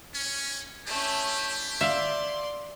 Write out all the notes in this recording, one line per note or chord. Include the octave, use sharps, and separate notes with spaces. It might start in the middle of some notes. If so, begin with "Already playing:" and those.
C#4
A3 C#4 D4 E4 G4
D5 E5 F5 C6